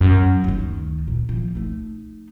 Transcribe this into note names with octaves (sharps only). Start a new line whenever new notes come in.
F#2
D2 D#3
A#2
D#3 F3
A3 D#4